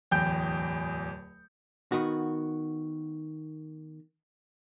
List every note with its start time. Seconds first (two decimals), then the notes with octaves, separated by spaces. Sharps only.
0.11 D1 E2 G5 G6
1.92 D#3 B3 F#4